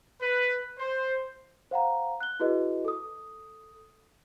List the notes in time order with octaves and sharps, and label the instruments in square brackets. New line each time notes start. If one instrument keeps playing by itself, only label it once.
[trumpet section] B4
C5
[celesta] C5 F5 F#5 A#5
F#6 G7
E4 F#4 G#4 B4 D#5
A4 D#6